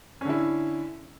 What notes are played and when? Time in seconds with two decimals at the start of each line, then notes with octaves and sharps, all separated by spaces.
0.21 C#4
0.25 D3
0.29 E4